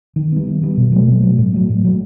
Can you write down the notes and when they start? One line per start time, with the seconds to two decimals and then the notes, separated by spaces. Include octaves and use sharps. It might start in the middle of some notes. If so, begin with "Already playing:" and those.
0.16 D#3
0.32 G3 B3
0.47 D#3
0.61 G3 B3
0.77 B2
0.92 F#3 A3
1.07 B2
1.23 F#3 A3
1.38 A2
1.53 F#3 A3
1.69 A2
1.84 F#3 A3